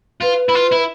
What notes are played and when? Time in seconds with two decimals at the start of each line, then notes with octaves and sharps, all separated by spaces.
0.22 F4 B4
0.49 E4
0.55 F4
0.72 E4